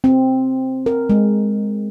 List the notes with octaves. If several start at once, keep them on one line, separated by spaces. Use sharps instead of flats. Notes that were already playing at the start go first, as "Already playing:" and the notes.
C4
A#4
G#3